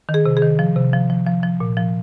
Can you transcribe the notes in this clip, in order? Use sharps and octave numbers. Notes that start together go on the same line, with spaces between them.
D#3
G#4
C3
G#4
D#3
F3
C3
F3
F3
F3
F3
A#2
F3